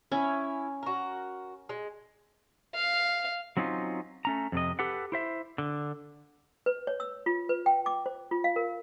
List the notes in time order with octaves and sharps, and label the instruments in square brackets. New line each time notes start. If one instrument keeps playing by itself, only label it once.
[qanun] C#4 [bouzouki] E4
[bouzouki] F#4 A#4
G#3
[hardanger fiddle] F5
[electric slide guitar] F#3 C4 C#4 D#4 F4
A3 C#4 A#5
F2 C3 D#5
G4 A4 B4 F#5
E4 C5 E5
D3
[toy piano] B4
C#5
E6
F4
B4
G5
D6
C5
F4
F5
A#4